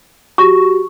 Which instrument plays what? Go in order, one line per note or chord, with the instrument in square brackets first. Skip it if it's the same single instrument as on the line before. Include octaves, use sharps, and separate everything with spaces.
[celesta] F#4 G4 [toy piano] C#6